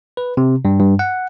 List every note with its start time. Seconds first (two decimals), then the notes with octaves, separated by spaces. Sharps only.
0.17 B4
0.37 C3
0.65 G2
0.80 G2
0.99 F#5